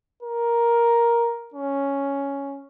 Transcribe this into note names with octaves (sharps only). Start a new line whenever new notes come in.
A#4
C#4